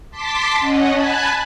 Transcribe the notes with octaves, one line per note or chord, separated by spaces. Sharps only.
A5 C6 D6 B6
C#4 D#5 F#5
G#5 A5 B5 F#6